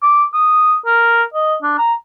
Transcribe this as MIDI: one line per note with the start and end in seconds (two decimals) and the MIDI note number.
0.02 0.24 86
0.34 0.76 87
0.86 1.23 70
1.34 1.56 75
1.63 1.75 62
1.78 1.94 82